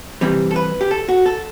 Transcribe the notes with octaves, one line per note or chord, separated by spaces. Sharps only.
C3 E3 G3 C4
A4
B4
G4
A4
F#4
A4